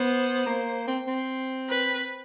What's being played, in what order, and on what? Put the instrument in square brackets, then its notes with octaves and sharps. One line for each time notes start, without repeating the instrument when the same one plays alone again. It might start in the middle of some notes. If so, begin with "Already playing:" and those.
Already playing: [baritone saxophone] B3 [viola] C5
[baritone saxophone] A#3
C4
C4
[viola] B4